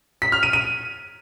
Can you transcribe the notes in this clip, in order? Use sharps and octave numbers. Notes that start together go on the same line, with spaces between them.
B6
F6
D#7
D#7